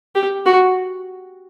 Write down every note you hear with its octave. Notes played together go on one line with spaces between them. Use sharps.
G4
F#4